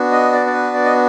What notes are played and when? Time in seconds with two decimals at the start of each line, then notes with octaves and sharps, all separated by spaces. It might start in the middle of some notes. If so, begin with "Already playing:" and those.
Already playing: B3 D4 F#4
0.11 D#5
0.33 D5
0.46 D5
0.53 B4
0.74 D5
0.85 D#5